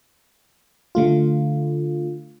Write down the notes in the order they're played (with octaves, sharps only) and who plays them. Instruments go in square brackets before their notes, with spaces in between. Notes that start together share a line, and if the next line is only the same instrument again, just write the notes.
[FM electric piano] D3 A3 F4